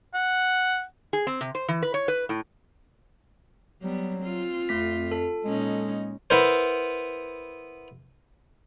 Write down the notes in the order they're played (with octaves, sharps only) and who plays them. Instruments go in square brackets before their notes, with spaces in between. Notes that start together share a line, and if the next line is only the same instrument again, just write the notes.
[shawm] F#5
[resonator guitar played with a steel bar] G#4
C4
C3
C5
E3
B4
C#5
B4
A2
[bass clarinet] F#3 [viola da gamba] G3 B3
[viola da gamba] C4 F4
[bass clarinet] F2 [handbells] A3 B6
[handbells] A4
[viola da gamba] A#2 C#4 D#4 [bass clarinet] G#3
[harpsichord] B3 E4 A#4 C5